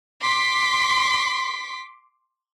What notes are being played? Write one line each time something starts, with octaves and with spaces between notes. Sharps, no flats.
C6 D6 B6